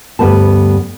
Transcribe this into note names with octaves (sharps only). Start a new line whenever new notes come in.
D2 G2 G3 B3 B4 A5